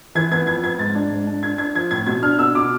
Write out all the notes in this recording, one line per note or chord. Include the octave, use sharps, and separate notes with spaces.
E3 G#6
B3 G#6
F2 G#6
B3 G#6
G#2 A6
D4
G#2
D4
D4 G#6
D4 G#6
F3 G#6
A2 G#6
B2 G#6
D4 F6
B2 E6
B2 D6